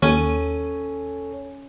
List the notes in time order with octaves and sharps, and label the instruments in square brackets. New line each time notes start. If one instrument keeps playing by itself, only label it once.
[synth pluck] D#2 D#7 [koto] C#4 [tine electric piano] A4 C#5